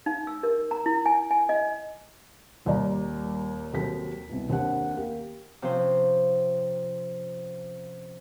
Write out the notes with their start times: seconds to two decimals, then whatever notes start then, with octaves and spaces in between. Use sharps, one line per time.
0.06 D#4
0.27 E6
0.43 A#4
0.71 A#5
0.86 E4
1.06 G#5
1.31 G#5
1.49 D#5
2.65 D#1 D#2 G3 D5 A#5
3.73 D#2 F#3 C4 G4 A4 B6
4.30 C2 B2
4.49 D#2 C4 D4 G4 A#4 F#5
4.94 A#3 G4
5.62 C3 F3 C#4 C5